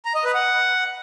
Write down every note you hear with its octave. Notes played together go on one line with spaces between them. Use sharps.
A#5
D#5
B4
F#5